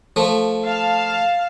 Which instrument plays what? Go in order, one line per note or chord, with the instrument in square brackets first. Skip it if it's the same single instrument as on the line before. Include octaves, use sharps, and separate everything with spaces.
[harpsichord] F3 A3
[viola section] F5 A5